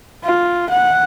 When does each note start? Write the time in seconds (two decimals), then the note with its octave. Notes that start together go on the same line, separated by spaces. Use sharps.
0.24 F4
0.70 F#5